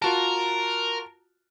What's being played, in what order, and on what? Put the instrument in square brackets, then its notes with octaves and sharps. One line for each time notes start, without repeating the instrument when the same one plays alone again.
[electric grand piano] F4 F#4 A5 [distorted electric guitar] A#4